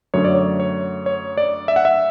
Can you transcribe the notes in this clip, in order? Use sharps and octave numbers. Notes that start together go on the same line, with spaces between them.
F#2 D3 F#3 A3 C#5
D5
C#5
C#5
C#5
D5
E5
F#5
E5